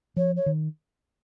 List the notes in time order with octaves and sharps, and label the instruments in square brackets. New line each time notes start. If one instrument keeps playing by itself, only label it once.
[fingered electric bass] F3 [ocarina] C#5
[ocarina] C#5
[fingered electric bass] D#3